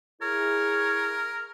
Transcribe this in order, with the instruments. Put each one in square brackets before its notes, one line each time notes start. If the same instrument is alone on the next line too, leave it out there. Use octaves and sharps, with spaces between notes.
[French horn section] E4 G#4 [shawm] A#4 [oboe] C#5